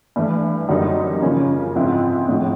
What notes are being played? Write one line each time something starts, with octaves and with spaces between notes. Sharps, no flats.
G2 E3 A3
F#2 D3 G3 A#3 D#4
C#3 F3 A#3 C#4
G#2 F3 G#3 C4 E4
A2 F3 G#3